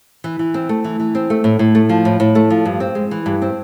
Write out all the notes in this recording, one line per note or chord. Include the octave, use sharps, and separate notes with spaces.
E3
E3
C4
A3
E3
E3
C4
A3
A2
A2
A3
F3
A2
A2
A3
F3
G2
C4
G#3
E3
G2
C4